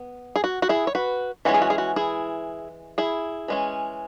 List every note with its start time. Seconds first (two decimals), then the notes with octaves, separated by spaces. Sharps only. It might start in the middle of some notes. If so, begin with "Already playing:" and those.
Already playing: B3
0.36 G#4
0.44 F#4
0.62 F#4
0.69 E4 G#4
0.87 C#5
0.95 F#4 B4
1.45 E3 G#3 C#4 F#4
1.54 G#4
1.62 F#4
1.70 G#4
1.78 F#4
1.96 E4 G#4
2.98 E4 G#4
3.48 E3 G#3 C#4